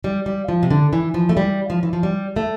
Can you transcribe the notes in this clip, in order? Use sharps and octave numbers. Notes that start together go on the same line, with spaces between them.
G3
G3
F3
C3
D3
E3
F3
A3
G3
F3
E3
F3
G3
A3